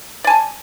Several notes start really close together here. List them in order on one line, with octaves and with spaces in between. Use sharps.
D5 G#5 A5